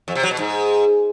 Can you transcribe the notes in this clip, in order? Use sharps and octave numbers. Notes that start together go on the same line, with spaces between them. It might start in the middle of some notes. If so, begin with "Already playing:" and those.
F2
C3
F#3
B2
G#2